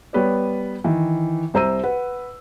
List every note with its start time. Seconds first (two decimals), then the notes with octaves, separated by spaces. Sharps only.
0.13 G3 B3 B4 C#5 D5
0.84 D#3 E3
1.54 C2 C5 A#5 E6 D#7
1.84 B4 F#5